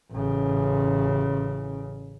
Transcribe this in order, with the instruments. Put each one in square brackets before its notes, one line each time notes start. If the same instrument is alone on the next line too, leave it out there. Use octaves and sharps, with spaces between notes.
[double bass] A1 C#3